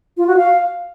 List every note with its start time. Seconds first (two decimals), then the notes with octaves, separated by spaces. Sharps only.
0.17 F4
0.27 F#4
0.37 F5